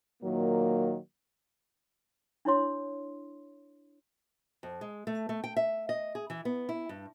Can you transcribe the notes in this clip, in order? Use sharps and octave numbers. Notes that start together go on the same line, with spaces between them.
A#2 D#3 F#3 A#3
D4 E4 C#5 C6
F2
G#3
A3
A3
G5
E5
D#5
G#4
E3
B3
E4
G2